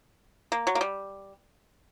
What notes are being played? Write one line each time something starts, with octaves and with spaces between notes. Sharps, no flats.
A#3
F#3
A#3
G3